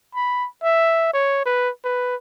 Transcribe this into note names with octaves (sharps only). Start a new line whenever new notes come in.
B5
E5
C#5
B4
B4